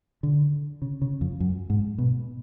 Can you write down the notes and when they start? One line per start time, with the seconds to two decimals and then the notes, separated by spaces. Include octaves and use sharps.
0.23 D3
0.82 C#3
1.02 C#3
1.21 F2
1.40 F#2
1.70 G#2
1.98 B2